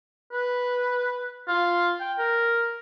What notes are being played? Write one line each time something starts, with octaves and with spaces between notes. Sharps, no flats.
B4
F4
G5
A#4